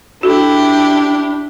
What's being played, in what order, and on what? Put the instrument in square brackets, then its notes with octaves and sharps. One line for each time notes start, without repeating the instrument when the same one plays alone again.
[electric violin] D4 [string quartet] E4 G4 [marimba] F#4 A4